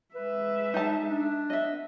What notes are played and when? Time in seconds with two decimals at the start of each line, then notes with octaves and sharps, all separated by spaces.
0.15 G#3 B4 E5
0.74 D#4 A5
1.09 D4
1.50 B3 D#5 E5